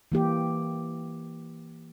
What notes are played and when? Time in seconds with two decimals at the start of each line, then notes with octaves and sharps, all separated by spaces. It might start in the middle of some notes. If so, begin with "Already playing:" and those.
0.12 E3 A#3 G4